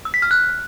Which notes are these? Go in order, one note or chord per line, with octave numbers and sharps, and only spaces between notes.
E6
B6
F6
F#6